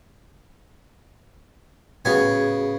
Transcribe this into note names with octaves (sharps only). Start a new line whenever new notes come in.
A2 C#3 B3 F#4 G#4 G#5